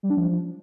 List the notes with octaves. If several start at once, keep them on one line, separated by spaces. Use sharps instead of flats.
G3
D4
F3